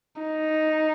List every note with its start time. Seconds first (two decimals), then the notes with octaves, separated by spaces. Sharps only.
0.22 D#4